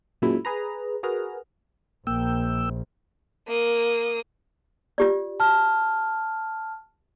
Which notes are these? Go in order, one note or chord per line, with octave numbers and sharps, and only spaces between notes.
F#2 A#2 F#3 G#3 E4
G#4 B4 A#5
F#4 G#4 A#4 B4 A#5
A#1 A#3 G5 E6
A#3 D#6
F4 G4 D5
A5 F6